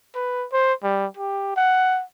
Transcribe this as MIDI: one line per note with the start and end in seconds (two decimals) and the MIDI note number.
0.15 0.46 71
0.52 0.73 72
0.83 1.06 55
1.17 1.54 67
1.56 2.03 78